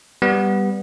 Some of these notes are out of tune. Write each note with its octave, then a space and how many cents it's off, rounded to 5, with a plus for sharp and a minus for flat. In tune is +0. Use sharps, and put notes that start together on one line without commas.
G3 +0 B3 -5